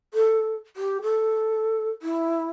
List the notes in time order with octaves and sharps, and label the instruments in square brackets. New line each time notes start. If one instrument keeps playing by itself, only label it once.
[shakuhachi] A4
G4
A4
E4